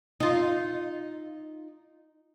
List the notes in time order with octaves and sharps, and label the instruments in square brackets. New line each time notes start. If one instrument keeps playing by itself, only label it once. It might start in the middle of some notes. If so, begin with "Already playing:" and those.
[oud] D#4 F4